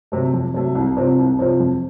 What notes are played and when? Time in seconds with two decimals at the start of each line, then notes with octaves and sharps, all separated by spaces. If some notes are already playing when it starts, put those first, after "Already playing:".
0.12 C3 F#3 A3
0.34 F2
0.54 C3 F#3 A3
0.75 C2
0.97 C3 F3 C4
1.18 C2
1.39 C3 F3 C4
1.60 F2